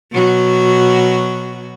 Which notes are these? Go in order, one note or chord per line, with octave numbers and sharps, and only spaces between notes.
B2 F#3 F#4